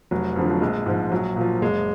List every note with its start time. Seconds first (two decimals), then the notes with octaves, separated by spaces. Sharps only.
0.11 F1 F#3
0.36 F2 D3 F3
0.50 F#3
0.61 A#1 G#3
0.86 G#2 F3
1.12 A#1 F#3
1.36 A#2
1.41 F3
1.61 F#1 G#3